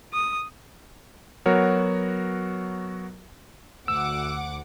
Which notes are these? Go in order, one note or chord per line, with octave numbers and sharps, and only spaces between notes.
D#6
F#3 B3 F#4 A#4 C#5
D2 F#5 D6 E6